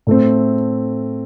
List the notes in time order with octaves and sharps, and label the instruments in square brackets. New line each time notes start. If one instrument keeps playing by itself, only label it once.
[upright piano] A2 A3 C4